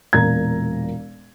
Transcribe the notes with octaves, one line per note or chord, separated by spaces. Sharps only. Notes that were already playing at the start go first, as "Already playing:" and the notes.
E1 A#2 A#5 G#6